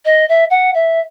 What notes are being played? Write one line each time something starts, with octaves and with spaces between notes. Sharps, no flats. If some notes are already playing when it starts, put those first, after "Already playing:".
D#5
E5
F#5
E5